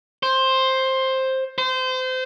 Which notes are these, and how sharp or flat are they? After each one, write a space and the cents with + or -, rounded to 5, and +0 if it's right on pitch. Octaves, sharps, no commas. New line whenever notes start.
C5 +10
C5 -25